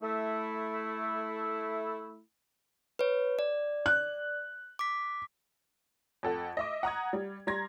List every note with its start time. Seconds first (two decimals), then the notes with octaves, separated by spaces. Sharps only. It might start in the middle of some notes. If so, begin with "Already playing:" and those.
0.03 A3 E4
2.99 B4 C#5
3.39 D5
3.86 F#6
4.79 D6 B6
6.23 F2 A4 F#5
6.57 D#5 E5 D6
6.83 F#5 A#5 D#6 G#6
7.13 G3
7.47 G3 A#5 C6 G#6 A#6